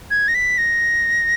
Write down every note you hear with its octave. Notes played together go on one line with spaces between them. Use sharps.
G#6
A#6
B6
A#6